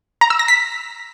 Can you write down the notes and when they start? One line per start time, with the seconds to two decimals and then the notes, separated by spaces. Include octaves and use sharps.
0.21 A#5
0.30 E6
0.39 A#6
0.48 B6